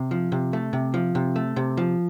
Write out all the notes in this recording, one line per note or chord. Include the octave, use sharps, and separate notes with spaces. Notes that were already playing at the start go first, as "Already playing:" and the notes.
Already playing: C3
F3
C3
A3
C3
F3
C3
A3
C3
F3